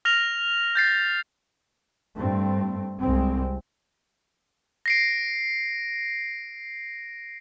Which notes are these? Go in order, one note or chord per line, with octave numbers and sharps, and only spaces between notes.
F6 A#6 F7
G6 A6 C7
G2 A3 C4
C2 G#3 C4
A#6 C7 D7